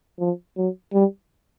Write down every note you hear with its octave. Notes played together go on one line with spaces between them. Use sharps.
F3
F#3
G3